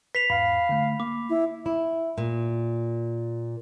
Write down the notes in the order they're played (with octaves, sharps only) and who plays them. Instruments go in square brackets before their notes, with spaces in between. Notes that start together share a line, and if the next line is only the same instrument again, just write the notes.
[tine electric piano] B4 [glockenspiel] B6 C7 F7
[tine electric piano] E2 G#2 [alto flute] F5 [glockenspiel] B5
[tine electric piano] D3 A3
[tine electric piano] A#3 [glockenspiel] D6
[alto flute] E4
[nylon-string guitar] E4
A#2